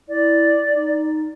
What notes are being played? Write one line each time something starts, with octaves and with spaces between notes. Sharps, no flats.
E4 D5
D#4